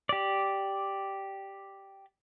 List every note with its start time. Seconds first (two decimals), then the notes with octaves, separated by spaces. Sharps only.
0.09 G4 D5